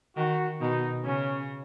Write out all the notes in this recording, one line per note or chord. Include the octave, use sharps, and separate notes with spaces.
D#3 F#4
B2 D#4
C#3 C#4